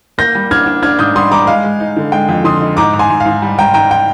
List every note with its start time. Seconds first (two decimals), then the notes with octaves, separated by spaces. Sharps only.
0.18 A#3 G6 A#6
0.35 G3
0.51 D4 F6 G#6
0.66 D4
0.83 D4 F6 G#6
0.99 G#2 D#6 G6
1.15 G3 C6 D#6
1.31 G3 A#5 D6
1.47 G#3 F5
1.64 G#3
1.80 D#4
1.96 D3
2.12 G#3 G5
2.28 F2
2.44 D3 C6 D#6
2.61 D#4
2.77 G#2 A#5 D6
2.93 G#2
2.99 G#5 C6
3.10 G#2
3.20 F5
3.26 G#2
3.42 G3
3.58 G3 G5 A#5
3.74 G#2 G5 A#5
3.91 G5